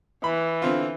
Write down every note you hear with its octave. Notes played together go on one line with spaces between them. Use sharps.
E3 B5
D3 C4 F4